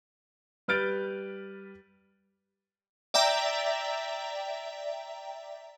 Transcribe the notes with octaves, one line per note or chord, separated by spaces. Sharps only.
G3 B4 F6 G6 A6 D7
D5 E5 G5 A#5